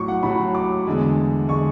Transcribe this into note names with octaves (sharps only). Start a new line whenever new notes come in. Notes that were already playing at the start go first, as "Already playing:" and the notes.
Already playing: A2 F#3 C#6 D6
F#5
A2 F#3 B5
D6
E2 D3 G#3
D3 G#3 C#6